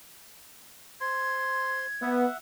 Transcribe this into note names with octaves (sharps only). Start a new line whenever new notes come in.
C5 C6 G#6
B3 E5 F#5